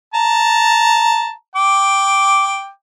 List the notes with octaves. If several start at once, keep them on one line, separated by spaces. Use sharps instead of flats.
A5 A#5
G5 D6